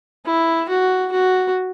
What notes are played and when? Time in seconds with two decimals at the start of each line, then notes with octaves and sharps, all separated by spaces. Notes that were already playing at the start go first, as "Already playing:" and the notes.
0.26 E4
0.69 F#4
1.12 F#4